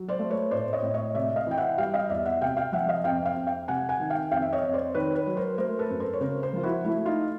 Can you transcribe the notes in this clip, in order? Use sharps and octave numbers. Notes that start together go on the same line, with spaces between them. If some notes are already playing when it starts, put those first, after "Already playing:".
Already playing: F#3
C5 D5
A3
B4 C#5
A2 C5 D5
C#5 D#5
A2
C#5 D#5
C3 D5 E5
D#5 F5
E3 G5
E5 F#5
G3 F5 G5
D#5 F5
E2 D5 E5
E5 F#5
C3 F5 G5
F5 G5
F3 E5 F#5
D#5 F5
F2 F5 G5
F5 G5
F2
F5 G5
C3 F#5 G#5
F#5 G#5
D#3
F5 G5
F2 F5 G5
E5
C#5 D#5
F2
C5 D5
D#3 B4 C#5
B4 C#5
F#3
A#4 C5
A3 A#4 C5
A4 B4
F#2
A#4 C5
C#5
C#3 A#4 C5
A#4 C5
F3 F4
E4 F#4
A3 E4
D#4 F4